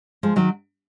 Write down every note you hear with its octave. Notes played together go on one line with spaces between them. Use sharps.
F3 G#3
D#3 F#3